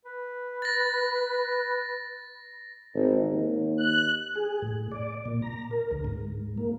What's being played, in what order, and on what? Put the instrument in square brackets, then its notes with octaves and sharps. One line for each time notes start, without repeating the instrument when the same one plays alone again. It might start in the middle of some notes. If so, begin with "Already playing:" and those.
[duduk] B4
[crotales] A6 A#6
[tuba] G#1
D#2
[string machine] F#6
[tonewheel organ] G#4
A2
D5
A#2
A#5
A#4
D2
G#2
A#3